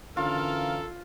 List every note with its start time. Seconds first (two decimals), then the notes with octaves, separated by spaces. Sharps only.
0.17 D3 E3 C#4 F4 A4 A#4 F5